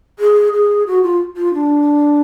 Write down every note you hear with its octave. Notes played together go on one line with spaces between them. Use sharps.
G#4
G#4
F#4
F4
F4
D4